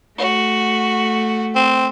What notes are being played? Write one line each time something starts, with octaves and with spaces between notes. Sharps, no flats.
A3 F#4
C4